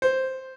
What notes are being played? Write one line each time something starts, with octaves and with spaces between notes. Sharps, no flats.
C5